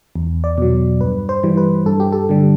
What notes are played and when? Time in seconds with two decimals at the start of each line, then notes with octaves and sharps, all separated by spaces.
0.16 E2
0.44 D5
0.58 B2 F#3
1.01 G2 B4
1.29 C5
1.43 E3 G3
1.57 B4
1.86 G2 A4
2.00 G4
2.12 A4
2.29 D3 G3